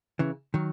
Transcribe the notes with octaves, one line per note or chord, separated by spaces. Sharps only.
C#3 E3
D#3 F#3